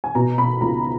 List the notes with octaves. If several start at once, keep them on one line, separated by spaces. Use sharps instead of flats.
G#5
B2 A#5
B2 B5
C#2 A#5